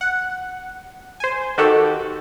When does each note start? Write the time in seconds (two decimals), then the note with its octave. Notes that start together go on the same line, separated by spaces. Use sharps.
0.01 F#5
1.20 C5 G#5
1.58 D#3 F#4 G4 A4